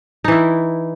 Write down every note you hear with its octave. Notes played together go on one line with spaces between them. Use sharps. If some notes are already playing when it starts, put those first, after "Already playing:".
E3 D#4 E4